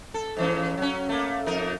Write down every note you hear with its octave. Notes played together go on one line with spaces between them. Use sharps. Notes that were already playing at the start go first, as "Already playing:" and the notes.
A4
G#2 E3 C#4
F#3 C#4
A3 A#3
F2 D#4 A#4